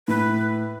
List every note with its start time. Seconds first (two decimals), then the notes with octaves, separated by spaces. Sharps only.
0.08 A2 B4